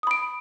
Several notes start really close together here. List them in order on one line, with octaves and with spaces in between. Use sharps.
D#6 B5 D7